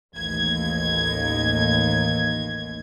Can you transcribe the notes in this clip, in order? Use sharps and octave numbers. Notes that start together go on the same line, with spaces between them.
A1 D#2 G#6